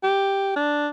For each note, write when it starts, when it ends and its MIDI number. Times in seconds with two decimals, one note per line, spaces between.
0.03 0.51 67
0.56 0.88 62